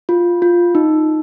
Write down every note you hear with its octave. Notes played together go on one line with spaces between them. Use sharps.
F4
F4
D#4